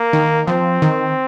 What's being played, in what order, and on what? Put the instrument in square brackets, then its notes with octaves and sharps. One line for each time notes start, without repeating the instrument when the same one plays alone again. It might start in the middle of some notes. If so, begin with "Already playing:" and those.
Already playing: [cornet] A#3
[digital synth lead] D#3
[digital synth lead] F3 [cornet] C4
[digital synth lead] D#3